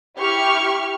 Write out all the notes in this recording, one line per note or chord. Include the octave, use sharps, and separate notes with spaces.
E4 G4 C#6 F6